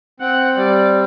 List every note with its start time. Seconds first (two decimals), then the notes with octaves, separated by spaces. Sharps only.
0.20 C4 F#5
0.57 G3 D5